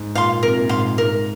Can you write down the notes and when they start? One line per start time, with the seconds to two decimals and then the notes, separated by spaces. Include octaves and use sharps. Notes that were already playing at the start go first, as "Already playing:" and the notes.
Already playing: G#2
0.15 A#2 F5 C6
0.43 C3 A#4
0.56 A#2
0.69 G#2 C3 F5 C6
0.98 G#2 A#4